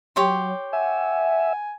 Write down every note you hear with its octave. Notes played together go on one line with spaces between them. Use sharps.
F#3 G4 C#5 C6
E5 F#5 G#5